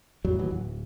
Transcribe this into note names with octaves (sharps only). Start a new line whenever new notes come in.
F2 A2 F#3 G3
D1 D#2 E3 F#3
D1